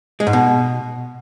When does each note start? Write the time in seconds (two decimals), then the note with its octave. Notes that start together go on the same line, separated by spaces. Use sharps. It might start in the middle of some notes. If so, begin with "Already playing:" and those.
0.20 G#3
0.27 G#2
0.33 B2